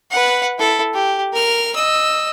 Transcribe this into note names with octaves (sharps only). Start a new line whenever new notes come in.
B4 F#5
E4 A4
G4
A#4 F6
D#5 E6